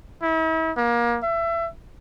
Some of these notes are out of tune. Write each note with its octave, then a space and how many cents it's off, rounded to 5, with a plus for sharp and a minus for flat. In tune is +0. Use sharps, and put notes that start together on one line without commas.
E4 -40
A#3 +30
E5 +25